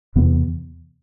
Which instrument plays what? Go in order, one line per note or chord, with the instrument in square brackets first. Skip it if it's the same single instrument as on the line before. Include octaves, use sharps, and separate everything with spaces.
[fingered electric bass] E2 C3 E3 B3